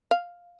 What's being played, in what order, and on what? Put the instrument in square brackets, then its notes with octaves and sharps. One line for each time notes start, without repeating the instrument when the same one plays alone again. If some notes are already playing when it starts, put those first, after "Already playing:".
[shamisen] F5